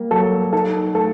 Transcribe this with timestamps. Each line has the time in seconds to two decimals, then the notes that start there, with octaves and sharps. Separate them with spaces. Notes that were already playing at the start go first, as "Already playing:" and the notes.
Already playing: G3 A#3
0.11 F#3 A4
0.52 D#4 A4
0.95 A3 A4